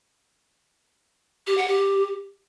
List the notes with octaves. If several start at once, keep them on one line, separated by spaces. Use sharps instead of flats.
G4
F#5
G4